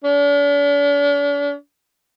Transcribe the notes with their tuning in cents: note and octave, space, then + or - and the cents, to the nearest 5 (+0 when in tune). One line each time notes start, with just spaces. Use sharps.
D4 -45